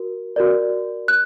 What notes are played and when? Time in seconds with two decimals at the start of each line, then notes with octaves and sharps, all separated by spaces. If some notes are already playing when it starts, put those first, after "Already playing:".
Already playing: F#4 A#4
0.36 F#4 A#4 D5
1.08 F#6